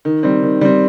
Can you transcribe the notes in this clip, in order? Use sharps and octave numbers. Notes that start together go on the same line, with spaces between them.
D#3
G3 C4
D#3
G3 C4